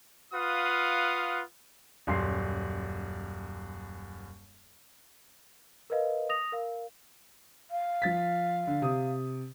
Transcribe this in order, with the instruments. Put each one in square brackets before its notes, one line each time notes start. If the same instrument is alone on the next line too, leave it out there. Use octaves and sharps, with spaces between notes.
[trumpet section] F4 B4 F5 F#5 D#6
[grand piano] D#1 F#2 C6 C7
[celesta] A#4 B4 D#5 F5
D#6 A#6 F7
A#4 F5
[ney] F5
[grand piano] F3 A6 B6
D3
C3 D#6